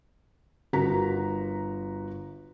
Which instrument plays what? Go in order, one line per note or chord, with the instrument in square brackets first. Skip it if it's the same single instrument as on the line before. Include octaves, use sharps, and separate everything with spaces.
[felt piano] G1 F#4 A#4 A#5 B6